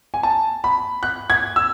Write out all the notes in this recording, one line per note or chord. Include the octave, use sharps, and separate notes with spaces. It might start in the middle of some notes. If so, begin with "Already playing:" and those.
G#5
A5
B5
F#6
G#6
E6